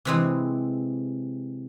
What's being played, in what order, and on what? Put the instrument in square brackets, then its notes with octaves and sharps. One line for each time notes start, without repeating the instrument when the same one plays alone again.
[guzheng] C3 E3 G#3